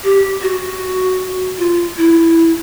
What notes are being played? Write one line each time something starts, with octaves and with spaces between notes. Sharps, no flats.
G4
F#4
F4
E4